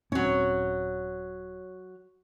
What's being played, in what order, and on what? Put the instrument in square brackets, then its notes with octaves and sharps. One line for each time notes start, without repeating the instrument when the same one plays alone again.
[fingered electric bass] D#1 C4 C#4 [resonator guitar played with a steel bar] F#3 C#5